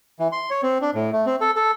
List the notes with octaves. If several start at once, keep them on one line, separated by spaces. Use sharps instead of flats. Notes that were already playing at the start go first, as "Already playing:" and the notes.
E3
C6
C#5
C4
D4
A2
A3
C4
A4
A4